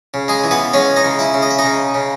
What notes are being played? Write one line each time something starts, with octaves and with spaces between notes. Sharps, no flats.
C#3
G#3 G#4
E3
B3 B4
G#3 C#4 C#5
D#4 D#5
C#3
E4 E5
C#3
D#5
E5
D#4 D#5
C#3
C#3